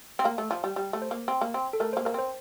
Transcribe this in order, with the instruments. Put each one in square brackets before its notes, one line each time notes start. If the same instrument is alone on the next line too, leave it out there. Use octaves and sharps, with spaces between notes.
[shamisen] C4
[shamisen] A#3 [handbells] F5
[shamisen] A3
F3
G3
G3
A3
[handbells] C5
[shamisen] A#3
C4
A#3
C4
[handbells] A4
[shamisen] A3 [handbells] A#4
[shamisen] A#3 [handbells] C5
[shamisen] A#3 [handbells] A#4
[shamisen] C4 [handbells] C5